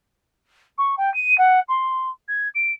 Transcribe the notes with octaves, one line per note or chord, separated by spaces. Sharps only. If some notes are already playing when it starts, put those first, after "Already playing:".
C#6
G5
D#7
F#5
C6
G#6
D7